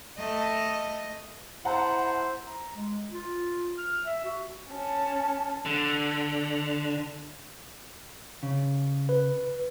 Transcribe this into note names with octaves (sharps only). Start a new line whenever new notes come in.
A3 D#5
E4 C5 F#5 A5 A#5
A#5
G#3
F4
F6
E5
F#4
C#4 A5
D3
C#3
B4